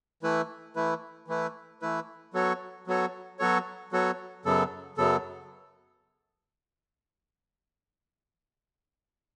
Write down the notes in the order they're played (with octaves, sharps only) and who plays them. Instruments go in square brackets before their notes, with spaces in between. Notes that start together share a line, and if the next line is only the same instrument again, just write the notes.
[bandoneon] E3 A3 E4 B4
E3 A3 E4 B4
E3 A3 E4 B4
E3 A3 E4 B4
F#3 B3 F#4 A4 C#5
F#3 B3 F#4 A4 C#5
F#3 B3 F#4 A4 C#5
F#3 B3 F#4 A4 C#5
F#2 C#3 F#3 B3 A4
F#2 C#3 F#3 B3 A4